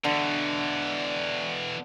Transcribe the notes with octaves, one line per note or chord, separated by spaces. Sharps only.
B2 D3 E3